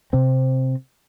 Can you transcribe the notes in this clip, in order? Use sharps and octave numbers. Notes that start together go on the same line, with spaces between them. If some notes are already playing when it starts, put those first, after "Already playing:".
C3 C4